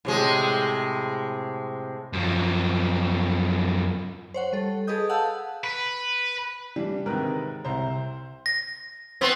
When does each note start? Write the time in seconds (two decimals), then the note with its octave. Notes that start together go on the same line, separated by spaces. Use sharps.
0.05 A2 C3 G#3
2.13 F#2 F3
4.34 C5 C#5 F#5
4.53 G3 A4
4.87 G#4 A4 B4 D#5 D#6 G6
5.09 F5 F#5 A5 E6 G6
5.64 B4
6.76 E3 G3 D4
7.06 G#2 C3 D#3 A#4 B4
7.64 C2 C3 C5 A#5
8.46 A#6
9.21 B3 C4